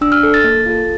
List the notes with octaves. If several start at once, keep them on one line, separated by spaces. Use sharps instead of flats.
D4 E6
F6
A4
A6
A#3
F4 A4